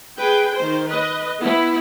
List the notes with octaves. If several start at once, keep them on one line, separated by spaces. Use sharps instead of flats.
G#4 B4 G5
D#3 C5
B4 D#5
B3 E4